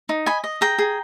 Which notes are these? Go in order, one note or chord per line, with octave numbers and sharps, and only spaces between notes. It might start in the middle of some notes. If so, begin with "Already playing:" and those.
D#4
D#5 G#5 B5
D#5
G#4 G5 A#5
G#4